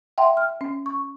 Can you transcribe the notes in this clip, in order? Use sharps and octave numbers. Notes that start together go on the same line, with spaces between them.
E5 F#5 G5 A5 C6
F6
C#4
C#6